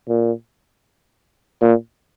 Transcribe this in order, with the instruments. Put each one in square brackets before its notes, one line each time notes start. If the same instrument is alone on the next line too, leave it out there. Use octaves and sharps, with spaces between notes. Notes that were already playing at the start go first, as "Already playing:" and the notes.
[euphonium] A#2
A#2